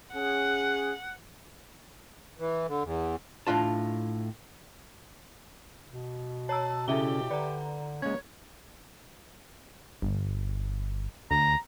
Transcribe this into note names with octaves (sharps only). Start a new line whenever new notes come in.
C#4 G#4 F#5
E3
D3
E2
A2 D4 F4 A5
B2
C#5 A5 A#5 E6
C#3 C#4 E4 G4 A4 E5 G7
D3 B4 D5 A#5
G#3 A#3 C#4 C#5 G#6
G1
D2 A#5